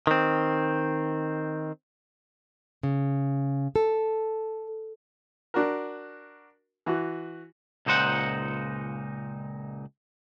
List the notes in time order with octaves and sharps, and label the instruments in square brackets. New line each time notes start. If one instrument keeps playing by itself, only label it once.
[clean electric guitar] D#3 C4
[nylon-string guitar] C#3
A4
[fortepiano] D4 F#4 A#4
E3 F#4
[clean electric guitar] C#2 A#2 D#4 C5 F#5